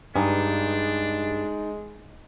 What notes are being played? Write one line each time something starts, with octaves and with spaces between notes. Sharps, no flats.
G2 G#3 D4 D#4 G#4 B4 G#5